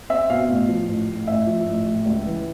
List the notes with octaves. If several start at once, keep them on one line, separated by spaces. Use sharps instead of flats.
C4 E5
B2 F5
A1
F3
A1
A2
A1 E5
F3
A1
A2
C#2
E3